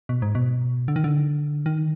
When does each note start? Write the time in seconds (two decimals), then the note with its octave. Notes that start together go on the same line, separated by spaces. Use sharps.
0.09 B2
0.22 G#2
0.35 B2
0.88 D3
0.96 D#3
1.04 D3
1.66 D#3